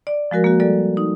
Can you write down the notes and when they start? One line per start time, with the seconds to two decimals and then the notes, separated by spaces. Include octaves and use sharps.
0.07 D5
0.31 F3 G#3 F#4 A#4
0.44 A#3 F#4
0.60 G3 A4 D5
0.97 D#4